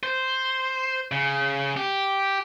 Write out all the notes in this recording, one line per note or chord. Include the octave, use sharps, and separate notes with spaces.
C5
C#3
G4